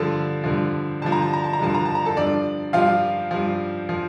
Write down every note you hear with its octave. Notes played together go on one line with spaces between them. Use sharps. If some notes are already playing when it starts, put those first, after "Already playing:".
Already playing: G2 D3 F3 A4 A5
G2 D3 F3
G2 D3 F3 A5
A#5
A5
A#5
A5
A#5
G2 D3 F3 A5
A#5
A5
A#5
A4 A5
G2 F3 D4 D5
G2 F3 F4 F5
G2 F3
F3